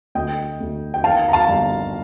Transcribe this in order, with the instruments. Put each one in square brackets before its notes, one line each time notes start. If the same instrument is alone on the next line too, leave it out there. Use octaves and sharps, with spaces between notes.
[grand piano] D2 D#5 G5
D2
G5
D#3 F5 A5
A#5
F5 A5
G1